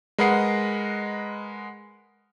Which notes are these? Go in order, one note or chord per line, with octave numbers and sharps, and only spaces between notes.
G#3 A#4 B4 D#5 F#5 C7